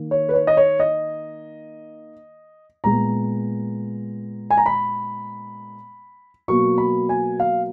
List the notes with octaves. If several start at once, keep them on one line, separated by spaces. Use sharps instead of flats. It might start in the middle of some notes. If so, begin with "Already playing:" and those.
Already playing: D#3 A#3
C#5
B4
C#5
D#5
C#5
D#5
A#2 G#3 B3 A#5
G#5
A#5
B5
B2 F#3 A#3 C#6
B5
G#5
F5